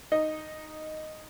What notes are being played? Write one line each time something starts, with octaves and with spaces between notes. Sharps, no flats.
D#4 D#5